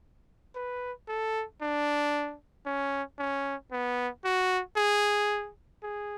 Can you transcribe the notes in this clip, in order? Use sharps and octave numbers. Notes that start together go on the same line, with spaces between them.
B4
A4
D4
C#4
C#4
B3
F#4
G#4
G#4